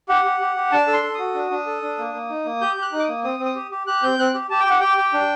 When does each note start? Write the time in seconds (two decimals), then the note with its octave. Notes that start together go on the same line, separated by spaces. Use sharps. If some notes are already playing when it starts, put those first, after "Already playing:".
0.09 G4 F#5
0.25 G4
0.40 G4
0.56 G4
0.72 D4 A5
0.87 A4
0.93 C6
1.03 A4
1.14 F#4 D#6
1.35 D4
1.51 D4
1.66 A4
1.82 D4
1.98 A#3
2.14 A#3
2.30 D#4
2.45 A#3
2.61 G4 G6
2.77 G4
2.82 F#6
2.92 D#4
3.00 D6
3.03 D#6
3.08 A#3
3.24 C4 D#6
3.40 C4
3.45 D#6
3.55 G4
3.71 G4
3.87 G4 F#6
4.03 C4 G6
4.19 C4 F#6
4.35 G4
4.50 G4 A5
4.60 G5
4.66 G4 F#5
4.80 G4 G5
4.98 G4
5.13 D4